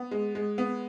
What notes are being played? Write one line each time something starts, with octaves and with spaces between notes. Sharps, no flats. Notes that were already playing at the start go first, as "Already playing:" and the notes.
Already playing: B3
G#3
G#3
B3